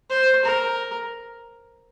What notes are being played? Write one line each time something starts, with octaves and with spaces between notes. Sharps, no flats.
C5
A#4